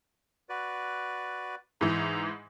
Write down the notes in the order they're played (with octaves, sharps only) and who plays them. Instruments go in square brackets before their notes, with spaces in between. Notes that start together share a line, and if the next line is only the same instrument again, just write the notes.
[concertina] F#4 B4 D5
[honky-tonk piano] G#2 E3 [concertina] A#5